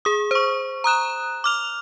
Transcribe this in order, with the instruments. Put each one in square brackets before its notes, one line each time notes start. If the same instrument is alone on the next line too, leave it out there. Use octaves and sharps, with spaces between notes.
[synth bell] G#4 D#6
C5 C#6
A#5 D#6 F#6 E7
D6 F6 F7